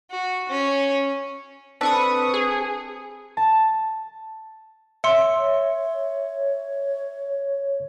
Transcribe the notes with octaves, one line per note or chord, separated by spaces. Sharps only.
F#4
C#4
C4 D4 A4 B4 C#6 D#6
G#4
A5
C#5 E5 C6 C#7